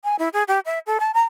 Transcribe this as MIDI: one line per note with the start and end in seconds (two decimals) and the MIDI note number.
0.04 0.16 80
0.19 0.28 64
0.33 0.43 68
0.48 0.59 67
0.66 0.79 76
0.86 0.98 69
1.00 1.11 81
1.14 1.22 82